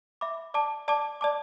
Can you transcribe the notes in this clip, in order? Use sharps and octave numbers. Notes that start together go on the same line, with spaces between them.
E5 B5 D6
D5 A5 D6
D5 A5 D6
D5 A5 D6